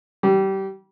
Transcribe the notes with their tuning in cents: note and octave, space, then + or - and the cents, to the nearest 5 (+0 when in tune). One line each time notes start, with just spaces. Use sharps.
G3 -25